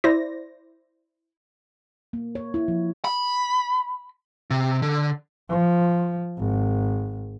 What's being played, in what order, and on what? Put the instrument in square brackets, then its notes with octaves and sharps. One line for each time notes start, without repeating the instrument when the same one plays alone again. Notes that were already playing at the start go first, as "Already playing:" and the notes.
[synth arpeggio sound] E4 C5 D5 A#6
[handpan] A#3
C#5
E4
F3
[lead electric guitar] B5
C3
D3
[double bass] F3
G#1